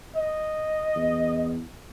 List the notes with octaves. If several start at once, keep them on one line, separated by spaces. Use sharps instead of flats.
D#5
E2